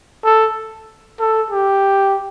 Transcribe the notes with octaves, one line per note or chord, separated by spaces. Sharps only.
A4
A4
G4